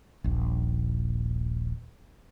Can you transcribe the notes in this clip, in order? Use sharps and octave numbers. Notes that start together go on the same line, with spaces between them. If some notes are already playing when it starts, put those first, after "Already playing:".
D#1 A#1